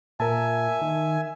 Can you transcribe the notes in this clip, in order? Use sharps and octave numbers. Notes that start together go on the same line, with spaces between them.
A#2 A#4 E5 G#5 A5
D#3